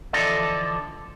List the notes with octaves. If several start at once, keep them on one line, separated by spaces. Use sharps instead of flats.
D3 E3 F3 A4 D5 D#5